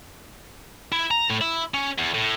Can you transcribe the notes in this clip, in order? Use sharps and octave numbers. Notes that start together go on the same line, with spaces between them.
E4
A#5
A2
E4
C#4
E2
A2